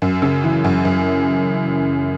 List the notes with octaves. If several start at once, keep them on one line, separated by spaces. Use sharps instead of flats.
F#2
C#3
E3
F#2
F#2